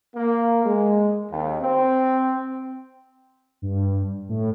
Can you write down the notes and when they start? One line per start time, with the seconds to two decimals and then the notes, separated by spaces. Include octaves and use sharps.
0.16 A#3
0.64 G#3
1.30 D#2
1.61 C4
3.62 G2
4.29 A2